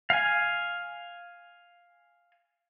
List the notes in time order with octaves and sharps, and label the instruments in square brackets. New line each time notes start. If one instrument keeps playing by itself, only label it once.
[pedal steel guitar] F5 G#5